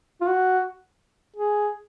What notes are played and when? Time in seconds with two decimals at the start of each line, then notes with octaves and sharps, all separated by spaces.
0.21 F4
0.27 F#4
1.37 G#4